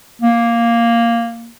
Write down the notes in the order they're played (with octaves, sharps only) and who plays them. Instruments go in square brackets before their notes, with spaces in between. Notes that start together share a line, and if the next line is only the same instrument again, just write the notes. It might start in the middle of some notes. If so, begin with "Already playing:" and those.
[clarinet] A#3